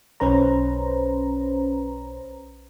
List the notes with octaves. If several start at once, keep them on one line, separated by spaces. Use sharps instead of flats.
B1 C#4 B4 C5 A#5